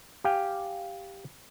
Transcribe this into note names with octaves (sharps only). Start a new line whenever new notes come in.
G4 F5 G5 G#5